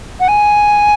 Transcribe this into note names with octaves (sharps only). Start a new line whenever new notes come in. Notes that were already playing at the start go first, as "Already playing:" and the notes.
F#5
G#5